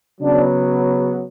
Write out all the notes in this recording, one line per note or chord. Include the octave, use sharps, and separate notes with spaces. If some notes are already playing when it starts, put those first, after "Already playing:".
C#3 F#3 B3 D4